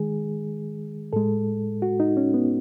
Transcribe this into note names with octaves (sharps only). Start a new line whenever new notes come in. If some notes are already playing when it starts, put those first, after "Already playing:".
Already playing: D#3 G#3 G#4
A2 G#3 A4
F#4
D#4
C#4
B3